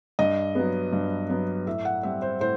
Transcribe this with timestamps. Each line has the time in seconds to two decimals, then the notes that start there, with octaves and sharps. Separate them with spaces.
0.19 G2 D#5
0.55 F#3 B3
0.93 G2
1.30 F#3 B3
1.66 A2 E5
1.85 F#5
2.03 G3 C4 E5
2.22 C5
2.40 A2 C5